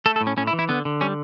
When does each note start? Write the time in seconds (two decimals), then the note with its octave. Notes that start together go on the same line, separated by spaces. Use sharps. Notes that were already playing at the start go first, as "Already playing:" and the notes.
0.06 A3 A4
0.16 A4
0.21 A2
0.27 C#4
0.37 A2 C#4
0.47 E4
0.53 E3
0.59 E4
0.69 D3 B3
0.85 D3
1.01 G3 C#4